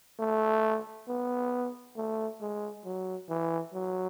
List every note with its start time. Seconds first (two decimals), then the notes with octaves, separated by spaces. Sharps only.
0.19 A3
1.08 B3
1.97 A3
2.41 G#3
2.85 F#3
3.29 E3
3.74 F#3